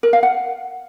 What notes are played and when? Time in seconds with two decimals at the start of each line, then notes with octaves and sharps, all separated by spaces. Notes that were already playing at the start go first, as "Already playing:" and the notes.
0.03 A#4
0.13 F5
0.23 F#5